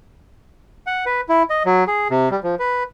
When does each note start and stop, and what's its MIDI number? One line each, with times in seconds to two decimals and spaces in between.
0.87 1.05 78
1.06 1.21 71
1.29 1.43 64
1.50 1.63 75
1.65 1.84 54
1.87 2.08 68
2.10 2.29 48
2.31 2.40 55
2.43 2.55 53
2.59 2.83 71